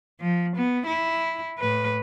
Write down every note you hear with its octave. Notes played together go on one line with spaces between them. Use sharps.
F3
B3
E4
A2 B4